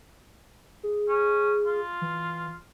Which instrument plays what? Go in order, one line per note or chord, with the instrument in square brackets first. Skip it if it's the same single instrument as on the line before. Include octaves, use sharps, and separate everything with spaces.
[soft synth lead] G#4
[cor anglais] C#4
F4
[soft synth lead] E3